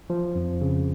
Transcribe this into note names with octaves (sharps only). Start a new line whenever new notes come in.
F3
F2
C#3